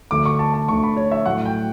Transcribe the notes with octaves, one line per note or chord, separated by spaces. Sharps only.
D2 D3 A3 D6
C#6
A5
A5
D2 D3 A3 C#6
B5
C#5
E5
A2 F#3 A3 F#5
G5